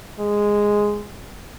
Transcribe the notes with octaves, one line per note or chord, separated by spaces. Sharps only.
G#3